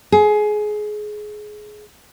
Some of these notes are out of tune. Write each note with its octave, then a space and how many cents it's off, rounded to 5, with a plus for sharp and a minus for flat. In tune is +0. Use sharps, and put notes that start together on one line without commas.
G#4 +20